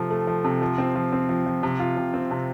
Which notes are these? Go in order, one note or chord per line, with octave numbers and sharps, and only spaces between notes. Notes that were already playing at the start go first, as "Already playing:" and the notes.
Already playing: C3 F3 A3 C4
A3
F3
C3
F3
C4
F3
C4
F3
F3
C3
F4
C3
C4
C3